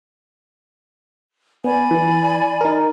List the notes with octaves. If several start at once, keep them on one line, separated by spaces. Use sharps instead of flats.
B3 D5 G#5 B5
E3
D#4 A#4